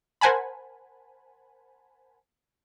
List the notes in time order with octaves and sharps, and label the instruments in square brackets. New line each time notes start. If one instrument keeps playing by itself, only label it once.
[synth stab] A#4 C5 F#5 G#5 A5 B5